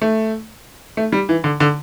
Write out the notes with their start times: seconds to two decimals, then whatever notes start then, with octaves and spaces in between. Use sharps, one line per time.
0.02 A3
0.97 A3
1.12 G3
1.29 E3
1.44 D3
1.60 D3